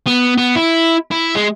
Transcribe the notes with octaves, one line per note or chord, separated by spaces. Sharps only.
B3
B3
E4
E4
G#3